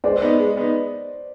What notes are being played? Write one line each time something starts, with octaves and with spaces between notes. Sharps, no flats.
G#3 C5 D5
B3 D#4
G#3
B3 D#4